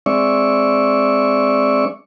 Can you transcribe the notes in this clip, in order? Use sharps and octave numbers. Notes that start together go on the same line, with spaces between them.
G#3 C4 D4 D5 E5 C#6